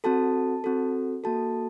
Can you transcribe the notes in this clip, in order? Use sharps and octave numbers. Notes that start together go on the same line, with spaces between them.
C4 F#4 A4 A5
C4 F#4 A4
A#3 F#4 A4 A5